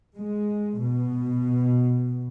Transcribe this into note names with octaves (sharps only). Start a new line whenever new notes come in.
G#3
B2